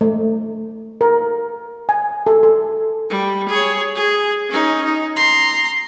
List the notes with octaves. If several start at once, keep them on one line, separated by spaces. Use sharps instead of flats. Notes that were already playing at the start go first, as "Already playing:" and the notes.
A3
A#4
G#5
A4
A4
G3
G#4 C#5
G#4
C#4 D#4
D#4
A#5 C6